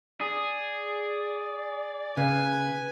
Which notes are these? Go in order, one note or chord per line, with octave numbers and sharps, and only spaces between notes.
G#4 D5
C#3 B4 G#5